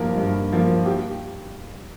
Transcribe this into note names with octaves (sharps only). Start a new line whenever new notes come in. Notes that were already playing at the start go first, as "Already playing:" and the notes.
Already playing: G2 F3 A#3 A#4
G2
F3 A#3
G4